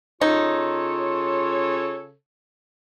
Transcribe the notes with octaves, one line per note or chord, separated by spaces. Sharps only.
C#3 D#4 F4 A4 C#5